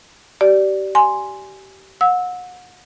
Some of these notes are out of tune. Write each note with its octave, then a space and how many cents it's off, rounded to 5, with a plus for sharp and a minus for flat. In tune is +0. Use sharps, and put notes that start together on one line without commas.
G4 -30 D5 +0
G#5 +0 C6 +0
F#5 -35 E6 -15